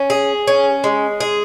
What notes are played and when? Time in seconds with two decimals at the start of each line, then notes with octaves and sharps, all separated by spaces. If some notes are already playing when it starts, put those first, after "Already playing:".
Already playing: C#4
0.10 G#4
0.47 C#4
0.84 G#3
1.20 G#4